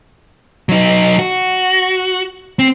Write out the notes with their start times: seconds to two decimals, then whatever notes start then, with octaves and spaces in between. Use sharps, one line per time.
0.69 F#3 D#4
1.19 F#4
2.59 C4